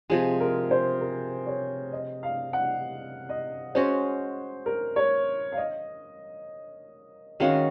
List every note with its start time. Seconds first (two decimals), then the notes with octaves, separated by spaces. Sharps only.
0.10 C3 F3 G#3 G#4
0.40 A#4
0.71 C5
1.01 A#4
1.46 C#5
1.92 D#5
2.23 F5
2.53 F#5
3.29 D#5
3.75 G#3 C#4 F#4 C5
4.66 A#4
4.96 C#5
5.52 F5
5.57 D#5
7.40 D#3 G#3 C#4 F#4 F5